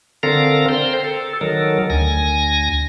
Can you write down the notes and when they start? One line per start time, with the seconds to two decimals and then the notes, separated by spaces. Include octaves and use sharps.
0.23 D3 C4 A4 A#4 F5 A#5
0.68 C5 G5 A#5 C6
1.04 A4
1.41 D#3 F#3 A4 A#4
1.90 D2 G#5 A#6